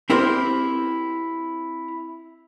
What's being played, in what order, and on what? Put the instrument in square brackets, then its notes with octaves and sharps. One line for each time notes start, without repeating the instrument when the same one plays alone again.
[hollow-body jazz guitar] C4 E4 G4 A#4 C5